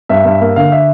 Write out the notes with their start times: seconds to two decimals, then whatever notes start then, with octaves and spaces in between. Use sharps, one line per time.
0.09 G2 E5
0.25 G2
0.41 A#3
0.56 D3 F5
0.72 E5